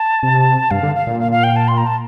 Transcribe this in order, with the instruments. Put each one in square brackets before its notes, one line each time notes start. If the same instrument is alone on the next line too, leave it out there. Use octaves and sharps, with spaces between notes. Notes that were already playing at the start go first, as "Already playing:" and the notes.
Already playing: [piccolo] A5
[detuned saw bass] C3
[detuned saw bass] G2 [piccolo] F5
[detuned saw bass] D3
[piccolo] F5
[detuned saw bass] A#2
[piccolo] F5
F5
G5
A5
C6
A#5
A5